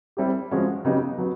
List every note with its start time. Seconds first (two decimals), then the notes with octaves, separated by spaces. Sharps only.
0.17 G3 C4 E4 G4
0.51 F3 G#3 C#4 F#4
0.85 C#3 F#3 B3 D#4 G4
1.18 F#3 B3